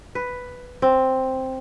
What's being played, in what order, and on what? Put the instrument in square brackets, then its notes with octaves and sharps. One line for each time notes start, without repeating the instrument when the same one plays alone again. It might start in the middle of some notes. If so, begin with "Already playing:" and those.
[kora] B4
C4